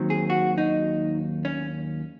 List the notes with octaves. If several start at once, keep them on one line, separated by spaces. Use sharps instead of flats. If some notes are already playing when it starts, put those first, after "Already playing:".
Already playing: D#2 D#3 F#3 C4
G#4
F#4
D#4
C#4